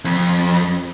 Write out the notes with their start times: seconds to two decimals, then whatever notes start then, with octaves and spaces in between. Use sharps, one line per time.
0.05 F2